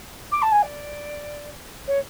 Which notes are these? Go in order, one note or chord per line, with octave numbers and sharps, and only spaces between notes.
D6
A5
G#5
D5
C#5